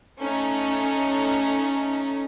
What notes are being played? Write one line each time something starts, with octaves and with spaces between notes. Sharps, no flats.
A3 C#4 D#4